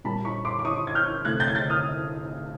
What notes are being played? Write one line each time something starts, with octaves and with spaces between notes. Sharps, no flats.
A#2 G3 A#3 A5 B5
B5 C#6
C6 D6
D6
C#6 D#6
G#6
F6 G6
C3 E3 A3 F#6 G#6
G6 A6
G#6
G6 A6
D#6 F6